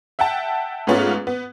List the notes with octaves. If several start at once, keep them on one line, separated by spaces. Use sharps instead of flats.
E5 F#5 G5 A5
G#2 G#3 A3 B3 C#4 F4
B3